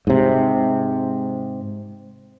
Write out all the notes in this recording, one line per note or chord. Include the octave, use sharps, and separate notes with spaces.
G#2 C3